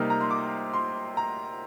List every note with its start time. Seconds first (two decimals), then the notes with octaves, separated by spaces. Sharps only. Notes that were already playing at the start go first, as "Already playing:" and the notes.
Already playing: C3 G3 A#3 D#4 F6
0.10 A#5
0.21 C6
0.31 D6
0.74 C6
1.17 A#5